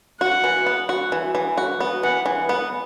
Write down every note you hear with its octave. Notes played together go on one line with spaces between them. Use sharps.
F#4 F#5
E3
B3
F#4
E3
E3
F#4
B3
E3 F#5
E3
B3